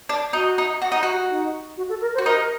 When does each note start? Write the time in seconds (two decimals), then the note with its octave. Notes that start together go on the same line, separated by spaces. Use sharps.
0.09 D4
0.33 D#4 F#4
0.58 D#4
0.82 F#4
0.92 D#4
1.03 F#4
1.30 D#4
1.77 F#4
1.89 A4
2.01 A#4
2.15 C5
2.18 F#4
2.26 D#4 A#4